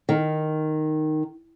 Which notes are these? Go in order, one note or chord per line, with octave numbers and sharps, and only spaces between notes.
D#3